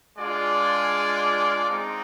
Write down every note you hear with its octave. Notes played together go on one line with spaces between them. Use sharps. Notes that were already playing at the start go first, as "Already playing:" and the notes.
G#3 D4 F4 G#4 D5
G#3 C4 D#4